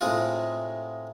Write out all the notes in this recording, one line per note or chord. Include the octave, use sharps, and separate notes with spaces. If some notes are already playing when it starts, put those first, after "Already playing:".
A2 C3 G#3 D#4 F4